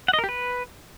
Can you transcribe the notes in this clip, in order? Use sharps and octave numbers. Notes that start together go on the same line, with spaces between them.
F#5
D#5
A#4
G4
B4